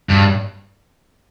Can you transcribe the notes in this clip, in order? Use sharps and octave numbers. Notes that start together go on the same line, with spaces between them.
G2